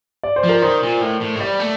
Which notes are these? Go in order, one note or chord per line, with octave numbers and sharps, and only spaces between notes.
D5
C5
F3
A#4
D#3 C5
A#2
A2
A2
A3
G3 D5
A3